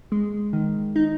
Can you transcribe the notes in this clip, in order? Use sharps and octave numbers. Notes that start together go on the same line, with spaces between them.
G#3
D#3
D#4